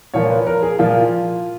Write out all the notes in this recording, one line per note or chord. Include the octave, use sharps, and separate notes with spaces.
A#2 F3 A#3 C#5
B4
A#4
G#4
A#2 F3 A#3 F4